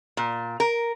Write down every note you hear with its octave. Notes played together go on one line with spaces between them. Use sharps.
A#2
A#4